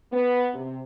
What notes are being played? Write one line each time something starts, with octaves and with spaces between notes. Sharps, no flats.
B3
C3